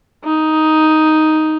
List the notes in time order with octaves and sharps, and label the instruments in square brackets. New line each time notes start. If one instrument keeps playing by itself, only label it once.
[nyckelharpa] D#4